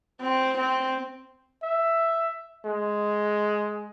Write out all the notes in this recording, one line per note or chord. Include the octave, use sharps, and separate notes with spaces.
C4
C4
E5
G#3